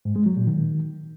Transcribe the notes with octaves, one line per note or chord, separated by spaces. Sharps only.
G#2
G#3
F#3
A#2
D#3